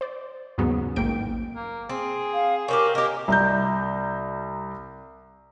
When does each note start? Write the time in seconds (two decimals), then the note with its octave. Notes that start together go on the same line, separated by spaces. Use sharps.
0.01 C5 D5
0.58 D#2 G#2 C#3 F#3 B3
0.96 A1 G#2 A#3 G5 D7
1.55 A#3
1.89 C4 G#4
2.34 F5
2.68 C4 C#4 D#4 G4 A#4
2.95 A#3 G4 A#4 D#5
3.28 C2 A#5 G6